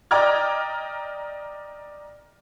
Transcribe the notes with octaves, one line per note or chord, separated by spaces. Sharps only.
D5 D#5 G5 A#5 F6 G#6